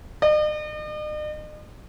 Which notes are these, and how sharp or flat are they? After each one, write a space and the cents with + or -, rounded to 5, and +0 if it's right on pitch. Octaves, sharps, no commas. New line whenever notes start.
D#5 -45